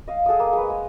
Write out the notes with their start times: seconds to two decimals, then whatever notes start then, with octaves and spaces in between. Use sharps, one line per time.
0.08 D#5 F5
0.26 G#4 A4 F#5 D#6
0.39 A#3
0.53 G#3 B4
0.70 G#3